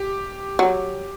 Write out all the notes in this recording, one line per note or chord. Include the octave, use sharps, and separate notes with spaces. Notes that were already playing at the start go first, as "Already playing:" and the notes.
Already playing: G4
F#3